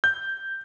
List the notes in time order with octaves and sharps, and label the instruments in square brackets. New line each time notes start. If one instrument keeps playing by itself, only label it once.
[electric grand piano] G6